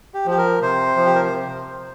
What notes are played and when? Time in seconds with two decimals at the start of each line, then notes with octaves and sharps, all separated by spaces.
0.14 G4
0.26 F3 G4
0.38 A#4
0.61 C3 C5
0.97 F3
1.06 G4
1.15 A#4
1.24 C5